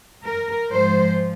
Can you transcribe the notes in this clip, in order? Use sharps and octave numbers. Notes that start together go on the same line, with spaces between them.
A#4
G#2 F3 C5